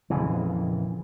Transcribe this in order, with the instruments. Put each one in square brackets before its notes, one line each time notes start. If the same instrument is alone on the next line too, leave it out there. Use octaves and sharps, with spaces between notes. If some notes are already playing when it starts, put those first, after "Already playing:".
[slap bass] A#1 F2 C#3 E3